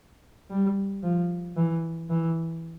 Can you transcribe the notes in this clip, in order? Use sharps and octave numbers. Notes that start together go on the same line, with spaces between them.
G3
F3
E3
E3